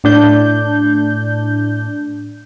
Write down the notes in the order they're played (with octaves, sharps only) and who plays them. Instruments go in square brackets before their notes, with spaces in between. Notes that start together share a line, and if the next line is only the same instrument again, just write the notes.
[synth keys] A2 D4 G6